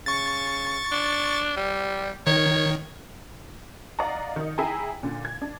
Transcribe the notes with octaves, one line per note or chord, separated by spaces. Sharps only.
C#3 C#6 A6
D4
G3
D#3 C#5
D5 D#5 F5 F#5 A#5
D#3 D#4
E4 G#4 G5 G#5 A#5
A#2 D3
G#6
D4